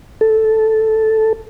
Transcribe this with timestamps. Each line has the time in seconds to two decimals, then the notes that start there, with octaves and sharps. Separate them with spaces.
0.21 A4